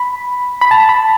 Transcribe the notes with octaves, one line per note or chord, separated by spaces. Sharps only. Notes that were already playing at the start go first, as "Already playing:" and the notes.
Already playing: B5
B5
A5
B5